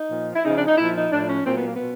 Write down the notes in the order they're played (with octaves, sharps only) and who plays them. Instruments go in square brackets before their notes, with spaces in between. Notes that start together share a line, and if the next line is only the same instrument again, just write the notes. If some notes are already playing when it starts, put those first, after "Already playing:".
Already playing: [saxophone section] D#4
A#2 F3
E4
C#3 D#4
F3
D4
D#4
A#2 F3 E4
D#4
A2 F3 D4
C#4
A#2 F#3 C4
B3
A#3
B2 B3